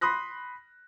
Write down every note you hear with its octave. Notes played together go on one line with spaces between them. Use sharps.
B5 C6 D#6 F#6 A#6